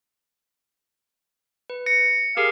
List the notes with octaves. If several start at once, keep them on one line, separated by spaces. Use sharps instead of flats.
B4
A#6 C#7
G4 G#4 A#4 F5